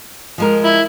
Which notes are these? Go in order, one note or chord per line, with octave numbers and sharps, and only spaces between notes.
F3 G#3 A#4
E4